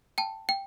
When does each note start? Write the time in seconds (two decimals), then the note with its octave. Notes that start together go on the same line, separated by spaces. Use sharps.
0.18 G5 A5
0.49 G5